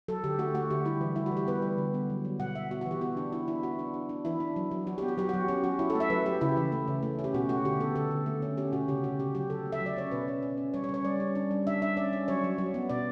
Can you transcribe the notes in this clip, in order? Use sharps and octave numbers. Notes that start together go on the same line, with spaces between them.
F#3 A4
D3 G4
A3 F#4
A3 F#4
D3 G4
G3 E4
E3
G3 E4
F#4
E3
G4
B3 B4
G3
D3
B3
F#3
F#3
B2 F#5
B3 E5
B3 F#4
F#4
E3 G4
B3 F#4
D4
D4 E4
B3 E4
B3 F#4
D4
D4
D4
E3 E4
D4
F#3
F#3
F#3 F#4
B3 G4
F#4
F#3 G4
F#3 F#4
C#4 G4
F#3 F#4
F#3 E4
A4
A3
E5
F#3 B4
F#3 G4
C#3 E4
E3
A3
C#3
A3
C#4
G4
B2 F#4
A3 F#4
D3 G4
B3 A4
D3 A4
D3
A3
C#4
C#4 G4
B2 F#4
C#3 G4
C#4 F#4
C#3 G4
F#3 G4
F#3 A4
A3
E5
F#3
D5
C#4 C#5
B2 B4
C#4
C#4
C#4
G3 C#5
C#5
C#4
C#5
G3 D5
C#4
D4
G3
D4 E5
D4 E5
C#4 D5
C#4
F#3 C#5
F#3
F#3
B3
B2 D5